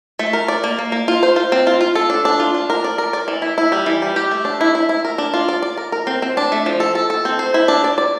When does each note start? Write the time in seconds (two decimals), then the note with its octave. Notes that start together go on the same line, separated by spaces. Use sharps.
0.19 A3
0.33 A#4
0.48 D5
0.64 A#3
0.79 A#3
0.92 A#3
1.08 F4
1.23 C5
1.36 F4
1.52 C4
1.67 F4
1.81 F4
1.95 A4
2.10 D4
2.25 D4
2.40 F4
2.54 D4
2.70 A#4
2.84 D5
2.98 A#4
3.13 D5
3.28 E3
3.42 E4
3.58 E4
3.72 G3
3.86 E3
4.02 G3
4.16 G4
4.31 A3
4.45 D4
4.61 E4
4.75 E4
4.89 E4
5.05 A#4
5.18 D4
5.34 F4
5.49 D5
5.62 D5
5.77 A#4
5.92 A#4
6.07 C4
6.22 C4
6.37 D4
6.52 A3
6.66 F3
6.80 A4
6.95 A4
7.10 A4
7.25 C4
7.39 C5
7.54 E4
7.68 D4
7.84 D5
7.98 D5